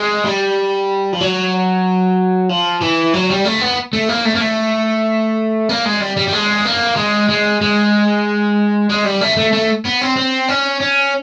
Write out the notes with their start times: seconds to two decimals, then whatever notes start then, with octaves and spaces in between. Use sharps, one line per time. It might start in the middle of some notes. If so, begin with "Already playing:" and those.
Already playing: G#3
0.25 G3
1.13 F3
1.21 F#3
2.49 F3
2.81 E3
3.14 F#3
3.29 G3
3.45 A3
3.61 B3
3.93 A3
4.09 A#3
4.25 A3
4.35 A#3
4.41 A3
5.69 A#3
5.85 G#3
6.00 G3
6.17 G3
6.28 G3
6.32 G#3
6.66 A#3
6.97 G#3
7.30 G#3
7.61 G#3
8.90 G#3
9.05 G3
9.21 A3
9.37 A3
9.53 A3
9.85 B3
10.01 C4
10.17 C4
10.49 C#4
10.81 C#4